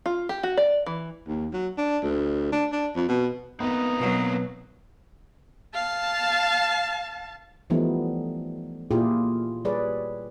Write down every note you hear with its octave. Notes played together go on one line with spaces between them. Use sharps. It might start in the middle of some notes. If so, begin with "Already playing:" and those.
F4
G4
F#4
D5
E3
D#2
F#3
D4
D2
D4
D4
F2
B2
B3 C4 D#4 A#4 B4
B2 F#3
F5 A5
E3 F3 G3 A3 B3 D#4
A#2 E4 F4 G4 G#4
G3 G#4 B4 C#5 D5